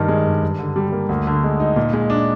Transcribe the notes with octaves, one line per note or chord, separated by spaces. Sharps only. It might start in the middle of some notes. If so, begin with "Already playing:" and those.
Already playing: G2 D#3
G#3
G2
G2
D3
G3
A#3
D2
D3
G#3
D#4
A#2
G#3
D4